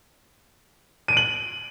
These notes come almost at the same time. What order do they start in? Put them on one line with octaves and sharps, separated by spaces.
D#7 D7 F#7